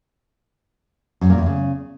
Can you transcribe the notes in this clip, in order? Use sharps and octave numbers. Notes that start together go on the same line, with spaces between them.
F#2
A#2
E2
C#3